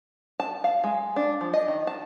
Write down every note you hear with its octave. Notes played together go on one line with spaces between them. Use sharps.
A5
F5
G#3
D4
F3
D#5
D#3
A5